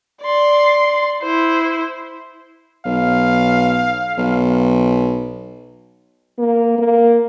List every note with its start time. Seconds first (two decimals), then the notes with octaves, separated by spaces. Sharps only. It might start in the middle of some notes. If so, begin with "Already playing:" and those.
0.22 D5 C6
1.22 E4 C5
2.86 B1 F5
4.18 B1
6.38 A#3
6.78 A#3